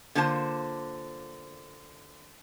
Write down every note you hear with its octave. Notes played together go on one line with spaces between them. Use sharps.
D3 A#3 F4 C5 A5